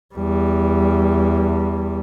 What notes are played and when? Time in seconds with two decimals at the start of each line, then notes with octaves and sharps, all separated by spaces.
0.15 E2 G3